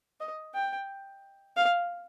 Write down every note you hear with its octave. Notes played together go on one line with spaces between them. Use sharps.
D#5
G5
F5